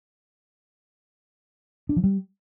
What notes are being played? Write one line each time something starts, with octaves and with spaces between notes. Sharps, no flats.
D4
F3
G3